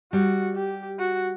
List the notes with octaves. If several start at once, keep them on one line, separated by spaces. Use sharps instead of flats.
G3 F#4
G4
F#4